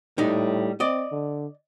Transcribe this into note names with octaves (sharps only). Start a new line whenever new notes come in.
A2 G3 D#4
C4 D5 D#5
D3